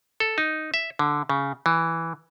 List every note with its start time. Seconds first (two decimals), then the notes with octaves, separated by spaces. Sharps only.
0.20 A4
0.38 D#4
0.74 E5
0.99 D3
1.30 C#3
1.66 E3